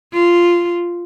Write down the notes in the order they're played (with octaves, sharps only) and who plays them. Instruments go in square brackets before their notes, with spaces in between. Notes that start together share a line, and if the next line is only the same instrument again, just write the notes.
[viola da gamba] F4